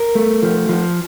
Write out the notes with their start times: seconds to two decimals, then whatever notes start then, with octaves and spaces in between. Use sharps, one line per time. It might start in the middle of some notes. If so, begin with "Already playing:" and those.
Already playing: A#4
0.15 A3
0.43 F3
0.69 F3